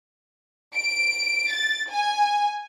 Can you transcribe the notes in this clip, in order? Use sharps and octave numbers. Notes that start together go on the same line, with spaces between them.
D7
A6
G#5